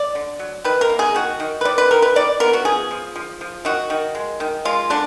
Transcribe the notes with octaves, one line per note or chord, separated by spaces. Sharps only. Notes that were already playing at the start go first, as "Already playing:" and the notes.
Already playing: D5
D3
F#3
D#3 B4
A#4
A#3
G#4
D#3 F#4
D#3
B4
D#3 D5
B4
D#3 A#4
B4
D#3 D5
B3 A#4
F#4
F3 G#4
F3
F3
F3
D#3 F#4
D#3
G#3
D#3
G#3 F4
D3 D4